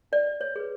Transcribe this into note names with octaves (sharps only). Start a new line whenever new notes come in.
D#4 D5
C#5
G#4 B4